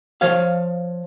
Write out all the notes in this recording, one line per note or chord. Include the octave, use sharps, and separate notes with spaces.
F3 C#5 F5